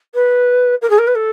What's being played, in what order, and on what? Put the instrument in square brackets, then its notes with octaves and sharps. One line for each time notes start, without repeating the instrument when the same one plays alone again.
[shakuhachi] B4
A#4
G#4
A#4
B4
A4